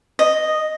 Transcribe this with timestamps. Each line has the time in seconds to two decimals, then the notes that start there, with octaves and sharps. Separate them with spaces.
0.19 D#5